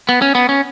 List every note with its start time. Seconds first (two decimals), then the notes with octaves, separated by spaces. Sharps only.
0.09 B3
0.22 C#4
0.35 B3
0.49 C#4